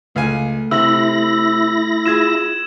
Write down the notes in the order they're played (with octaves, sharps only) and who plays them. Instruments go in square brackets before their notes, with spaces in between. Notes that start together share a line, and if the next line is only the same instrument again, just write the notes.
[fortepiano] C#2 F5 G#5 [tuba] A3
[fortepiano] C3 [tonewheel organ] E4 A#6 [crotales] E6 F#7
[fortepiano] F4 G#4 [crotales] E6 G#6 E7